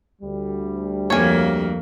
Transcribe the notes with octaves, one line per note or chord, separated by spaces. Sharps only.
D2 G3
F2 A#3 C#5 G#5